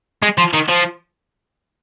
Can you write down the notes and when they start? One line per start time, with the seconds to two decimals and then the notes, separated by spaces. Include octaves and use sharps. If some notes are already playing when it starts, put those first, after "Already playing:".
0.22 G#3
0.38 F3
0.54 D#3
0.68 F3